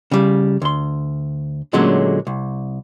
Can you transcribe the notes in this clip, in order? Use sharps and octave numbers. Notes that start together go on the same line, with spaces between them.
C#3 G3
D2 C6
A#2 D3 F#3 G#3 A3 C#4
C2